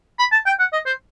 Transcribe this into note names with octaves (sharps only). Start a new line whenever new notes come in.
B5
A5
G5
F#5
D#5
C5